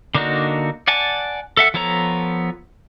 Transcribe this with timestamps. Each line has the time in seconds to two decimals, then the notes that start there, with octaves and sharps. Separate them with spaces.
0.15 D3 A#3 D4 D#4 F#4
0.88 D5 F#5 G#5 A5
1.57 A4 E5 F#5
1.74 F3 B3 A4 C#5 A#5